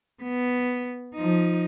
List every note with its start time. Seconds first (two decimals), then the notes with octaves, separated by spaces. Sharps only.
0.23 B3
1.15 F3 D#4